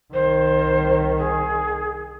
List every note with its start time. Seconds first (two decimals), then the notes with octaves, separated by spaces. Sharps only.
0.14 C2 D#3 C5
1.18 G#4